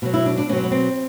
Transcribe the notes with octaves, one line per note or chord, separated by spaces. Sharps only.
B2 F#3
E4
D4
D4
B2 F#3 C4 C#4
B3
C4